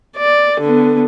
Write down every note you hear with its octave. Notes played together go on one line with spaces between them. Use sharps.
D5
D3 B3